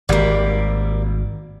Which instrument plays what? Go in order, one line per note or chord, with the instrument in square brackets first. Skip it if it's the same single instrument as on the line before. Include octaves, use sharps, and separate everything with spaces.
[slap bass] G#1 [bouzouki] G3 A#3